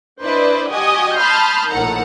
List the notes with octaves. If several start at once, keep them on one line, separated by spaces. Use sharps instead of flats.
D4 E4 B4 C5 D5 D#5
F#4 G4 D#5 G#5 D#6
A5 B5 C6 D#6 F6 G6
A#1 A2 D#3 A4 F#5 A#5